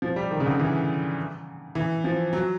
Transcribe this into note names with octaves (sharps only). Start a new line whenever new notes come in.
F3
G3
D#3
C#3
D3
E3
E3
F3
F#3